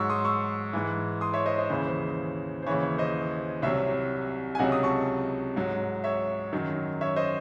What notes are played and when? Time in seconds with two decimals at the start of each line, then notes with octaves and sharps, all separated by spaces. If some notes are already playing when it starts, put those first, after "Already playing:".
Already playing: G#2 F#3 C#6 E6
0.10 C6 D#6
0.25 C#6 E6
0.73 G#2 E3
1.21 C6 D#6
1.34 C#5 E5
1.46 C5 D#5
1.58 C5 D#5
1.70 D#2 C#3 E3 C5
1.88 C5
2.63 C5
2.66 D#2 C#3 E3 C#5
2.83 C#5
2.98 C5 D#5
3.62 C2 C3 F#3 C#5 E5
4.55 G#5
4.59 C#2 C3 F#3 D#5 F#5
4.72 D#6
4.83 A5 C#6
5.56 G#2 F#3
6.04 C#5 E5
6.53 F#2 D#3 F#3
7.01 C#5 E5
7.16 C5 D#5